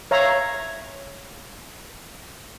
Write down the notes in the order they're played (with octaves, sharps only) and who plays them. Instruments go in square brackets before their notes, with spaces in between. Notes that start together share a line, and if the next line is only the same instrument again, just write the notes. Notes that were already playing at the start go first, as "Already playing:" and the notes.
[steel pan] C#5 E5 F5 A#5